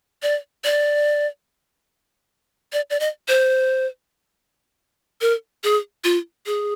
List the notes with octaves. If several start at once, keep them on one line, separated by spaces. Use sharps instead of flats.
D5
D5
D5
D5
D#5
C5
A#4
G#4
F4
G#4